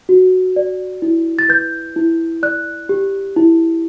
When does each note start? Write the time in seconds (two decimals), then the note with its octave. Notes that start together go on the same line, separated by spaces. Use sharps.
0.09 F#4
0.56 D5
1.02 E4
1.39 A6
1.49 B4 G6
1.96 E4
2.43 D5 F#6
2.89 G4
3.36 E4